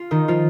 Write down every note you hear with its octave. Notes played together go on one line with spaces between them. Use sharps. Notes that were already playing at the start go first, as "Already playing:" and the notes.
Already playing: F4
D#3 D#4
F3 F4